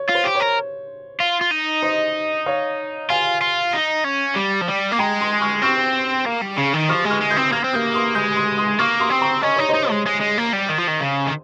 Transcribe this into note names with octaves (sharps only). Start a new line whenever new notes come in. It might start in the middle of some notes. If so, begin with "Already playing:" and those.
Already playing: C#5
F4
C5
G4
C#5
A#4
F4
F4
D#4
C5 D#5
C#5 F5
F4 F5 G#5
F4
D#4
C#4
G3
F3
G3
A#3
G#3 G5 A#5
C6 D#6
C#6 F6
C4 C#6 F6
A#3
G3
C#3
D#3
F3 C#6 F6
G#3
C#6 F6
G#3
D#6 G6
C4
A#3 F6 G#6
C4
A#3 D#6 G6
C6 D#6
G#3 D#6 G6
C6 D#6
C6 D#6
A#3 C#6 F6
C6 D#6
C4
A#5 C#6
C#4 D#5
D#4 C#5
D#4 C5 D#5
G#3
G#3
G#3
A#3
G3
D#3
F3
D#3
C#3
D#3